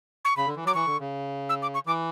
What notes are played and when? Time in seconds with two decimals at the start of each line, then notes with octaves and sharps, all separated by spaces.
0.25 C#6
0.37 C#3 B5
0.46 D3
0.56 E3
0.65 F#3 D6
0.74 E3 C#6
0.86 D3
1.00 C#3
1.49 E6
1.62 D6
1.74 C#6
1.86 E3 D6